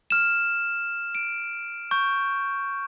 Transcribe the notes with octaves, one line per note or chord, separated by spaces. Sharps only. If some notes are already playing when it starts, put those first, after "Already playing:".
F6 E7
D7
C#6 G6